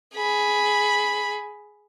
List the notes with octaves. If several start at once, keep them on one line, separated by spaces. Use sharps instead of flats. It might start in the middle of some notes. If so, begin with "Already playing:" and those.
G#4 B5